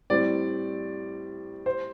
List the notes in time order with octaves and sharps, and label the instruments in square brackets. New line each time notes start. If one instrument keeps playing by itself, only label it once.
[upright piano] A2 G3 C4 [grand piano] D5
[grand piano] C5